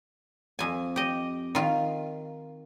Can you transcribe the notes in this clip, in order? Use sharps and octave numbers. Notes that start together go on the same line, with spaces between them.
F2 G#5
G4 D#5
D#3 F4